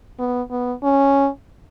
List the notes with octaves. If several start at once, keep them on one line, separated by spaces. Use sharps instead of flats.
B3
B3
C#4